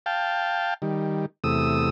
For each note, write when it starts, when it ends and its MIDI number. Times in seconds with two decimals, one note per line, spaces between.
0.06 0.74 77
0.06 0.74 79
0.06 0.74 81
0.82 1.26 51
0.82 1.26 55
1.44 1.90 40
1.44 1.90 48
1.44 1.90 57
1.44 1.90 87
1.44 1.90 88